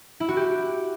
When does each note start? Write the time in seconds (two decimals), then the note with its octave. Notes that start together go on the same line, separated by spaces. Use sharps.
0.20 E4
0.28 F#4
0.37 G4